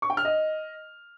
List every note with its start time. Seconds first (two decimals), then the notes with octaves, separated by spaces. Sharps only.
0.02 C#6
0.10 G5
0.17 F6
0.25 D#5